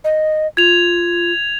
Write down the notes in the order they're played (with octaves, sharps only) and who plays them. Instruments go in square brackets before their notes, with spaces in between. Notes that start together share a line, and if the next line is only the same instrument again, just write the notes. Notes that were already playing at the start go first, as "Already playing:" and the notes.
[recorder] D#5
[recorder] F4 [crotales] G#6 F7